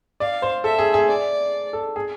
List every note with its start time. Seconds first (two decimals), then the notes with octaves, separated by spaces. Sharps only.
0.20 D5 F5
0.42 C5
0.64 A4 E5
0.79 G#4
0.94 G#4
1.08 D5
1.73 A4
1.96 G#4